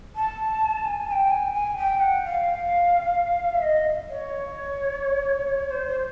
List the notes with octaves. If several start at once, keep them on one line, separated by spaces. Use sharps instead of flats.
A5
G#5
G#5
G5
G#5
G#5
G5
F#5
F5
E5
D#5
C#5
C5
C5